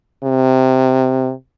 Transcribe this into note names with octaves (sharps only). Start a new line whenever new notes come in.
C3